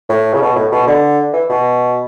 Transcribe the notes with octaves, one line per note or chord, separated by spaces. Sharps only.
A2
C#3
B2
A2
B2
D3
E3
B2